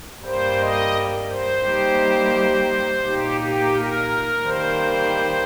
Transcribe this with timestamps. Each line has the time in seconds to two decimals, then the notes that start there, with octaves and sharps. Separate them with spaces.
0.24 G2 G3 A#3 C5
0.60 D#5
1.30 C5
1.65 G3 A#3 D#4 G4
3.05 A#2 A#3 D#4 G4
3.41 G4
3.76 A#4
4.45 D#3 G3 A#3 C5